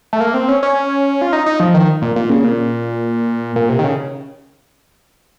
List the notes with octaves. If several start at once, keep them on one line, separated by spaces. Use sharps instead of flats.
A3
A#3
C4
C#4
C#4
F4
D#4
D#4
F3
D#3
A#2
A#2
C#3
A#2
A#2
C3
D#3
C#3